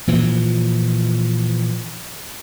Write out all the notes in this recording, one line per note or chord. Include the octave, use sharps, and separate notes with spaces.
A#2 E3 F3